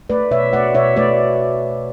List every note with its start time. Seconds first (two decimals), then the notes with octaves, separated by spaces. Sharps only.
0.10 A3 B4 D5
0.31 B2 C#5 E5
0.53 A3 D5 F#5
0.75 B2 C#5 E5
0.96 A3 B4 D5